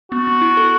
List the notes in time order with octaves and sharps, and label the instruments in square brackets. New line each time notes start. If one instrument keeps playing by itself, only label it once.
[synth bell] B3 [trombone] F#4
[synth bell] B3
E4
A4